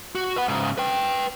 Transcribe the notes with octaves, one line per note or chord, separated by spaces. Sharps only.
F#4
B4 F#5
G#2 C#3
B4 G5